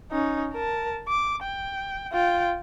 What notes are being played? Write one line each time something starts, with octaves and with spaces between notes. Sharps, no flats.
C#4 D#4
A#4 A5
D6
G5
F4 G5